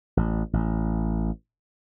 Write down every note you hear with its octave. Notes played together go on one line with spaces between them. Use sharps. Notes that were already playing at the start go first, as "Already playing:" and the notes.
A1
A1